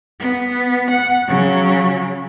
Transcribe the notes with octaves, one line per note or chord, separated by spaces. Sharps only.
B3
F#5
C#3 F#3